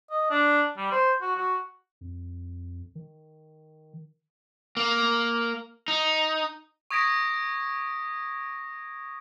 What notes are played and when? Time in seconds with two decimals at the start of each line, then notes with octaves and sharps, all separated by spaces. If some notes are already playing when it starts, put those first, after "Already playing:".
0.10 D#5
0.30 D4
0.77 G3
0.92 C5
1.21 F#4
1.36 F#4
2.01 F2
2.95 D#3
4.77 A#3
5.88 D#4
6.91 C#6 D#6 G#6 A#6 B6 D7